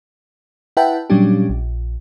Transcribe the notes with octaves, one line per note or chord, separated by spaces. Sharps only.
E4 B4 E5 F#5 G5 A5
A#2 F#3 G3 C#4 D4 G4
A#1